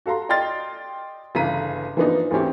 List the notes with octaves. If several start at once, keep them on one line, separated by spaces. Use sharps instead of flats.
F#4 A4 F5 A#5 C6
D5 D#5 G5 C6 F6 A6
G1 C#3 E3 A#5 B6 D#7
E3 F3 A#3 B3 D4 D#4
D2 E3 C4 C#4 G4